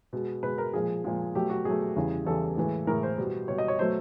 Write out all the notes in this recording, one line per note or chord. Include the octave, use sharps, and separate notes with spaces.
B2 G#3
B2 G#3 B4
A#4
A#2 F3 G#3 G#4
A#2 F3 G#3
B2 F#3 A3 G4
F#4
B2 F#3 A3 G#4
E2 C#3 E3 G3
E2 C#3 E3 G3 A4
A2 E3 G#3
A2 E3 G#3 A#4
C5
B2 G3
B2 G3 C#5
D#5
C#5
B2 F#3 A3 C5